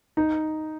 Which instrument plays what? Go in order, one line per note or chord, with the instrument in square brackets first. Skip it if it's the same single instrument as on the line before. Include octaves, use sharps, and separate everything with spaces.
[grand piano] D#4